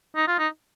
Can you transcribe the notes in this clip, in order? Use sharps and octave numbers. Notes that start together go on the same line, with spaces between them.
D#4
F4
D#4